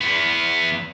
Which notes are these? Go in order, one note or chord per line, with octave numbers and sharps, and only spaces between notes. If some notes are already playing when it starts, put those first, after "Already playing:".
E2 B3